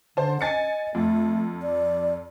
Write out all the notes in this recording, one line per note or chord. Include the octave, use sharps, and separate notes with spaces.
D3 C5 A5
D#5 G#5 A6 C#7
F2 A3
D5